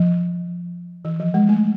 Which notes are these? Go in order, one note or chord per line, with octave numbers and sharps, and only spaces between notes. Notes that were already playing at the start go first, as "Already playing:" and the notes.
Already playing: F3
E3
F3
G#3
A3